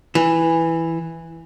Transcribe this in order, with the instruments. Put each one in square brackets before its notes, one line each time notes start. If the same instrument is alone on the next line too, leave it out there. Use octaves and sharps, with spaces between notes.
[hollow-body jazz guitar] E3